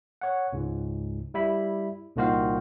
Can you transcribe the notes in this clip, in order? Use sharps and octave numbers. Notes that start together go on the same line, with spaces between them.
C#5 F#5
C#2 G#2
G3 E4 B5
C2 A#2 D#3 F#4 C5 F5